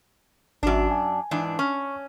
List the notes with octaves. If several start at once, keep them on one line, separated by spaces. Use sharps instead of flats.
G#1 F#2 D4 F#4
G#5
G#2 E3 D4
C#4 C#6